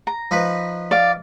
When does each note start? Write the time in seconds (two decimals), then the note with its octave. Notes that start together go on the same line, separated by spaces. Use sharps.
0.07 A#5
0.31 F3 D#4 B4
0.91 D5 F5